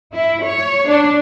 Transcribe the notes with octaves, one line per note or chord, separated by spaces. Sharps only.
E4
C#5
D4